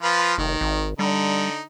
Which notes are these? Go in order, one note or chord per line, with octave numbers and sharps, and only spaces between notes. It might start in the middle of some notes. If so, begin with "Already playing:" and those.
F3 F4 B4
F1 D#3
G#1
D3 G3 D#4